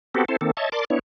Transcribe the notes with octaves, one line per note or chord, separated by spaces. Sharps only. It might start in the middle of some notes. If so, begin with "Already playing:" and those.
B3 C4 F#4 G4 A4
C4 E4 A4 C5
D#3 A#3 C4 A4
C#5 D#5 E5 A5
A#4 D5 A5 C6 D6
B3 D4 E4 C#5